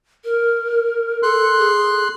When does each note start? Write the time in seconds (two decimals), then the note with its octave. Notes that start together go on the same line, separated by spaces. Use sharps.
0.24 A#4
1.23 A4 C6 F#6
1.59 G#4